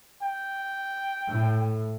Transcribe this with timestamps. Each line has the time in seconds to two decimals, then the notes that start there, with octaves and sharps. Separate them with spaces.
0.23 G5
1.30 A2